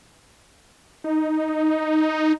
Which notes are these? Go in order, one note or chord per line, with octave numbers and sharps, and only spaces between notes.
D#4